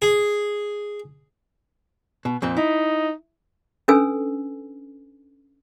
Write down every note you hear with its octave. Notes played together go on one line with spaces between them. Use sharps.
G#4
B2
F2 A#2 C4
D#4 E4
C#4 D4 A4 B4 G#5 E6